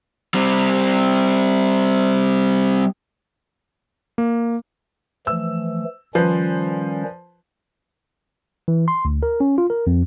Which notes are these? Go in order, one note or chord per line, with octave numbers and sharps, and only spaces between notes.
G3 C4
A#3
E3 F3 A3 E6
D#3 F3 G3 C#4 B4 C5
E3
C6
D2
A#4
C#4
F4
A#4
F2